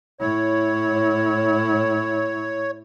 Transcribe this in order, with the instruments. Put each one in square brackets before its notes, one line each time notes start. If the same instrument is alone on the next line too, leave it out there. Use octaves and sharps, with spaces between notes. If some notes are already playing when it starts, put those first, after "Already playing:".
[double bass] A2 E4 [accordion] C#5